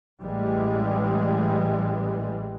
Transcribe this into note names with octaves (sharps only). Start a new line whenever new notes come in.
A1 E3 G3 G#3